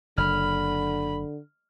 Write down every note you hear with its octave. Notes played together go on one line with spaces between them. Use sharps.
F#1 D3 B5 F6